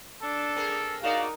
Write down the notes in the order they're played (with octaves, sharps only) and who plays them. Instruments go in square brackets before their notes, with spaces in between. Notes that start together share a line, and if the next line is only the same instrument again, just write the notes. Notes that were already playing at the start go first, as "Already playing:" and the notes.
[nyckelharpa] D4 [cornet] A4
[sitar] C4 G#4 A#4
[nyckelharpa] D#4 A#4 [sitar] F#4 D5 [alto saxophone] F5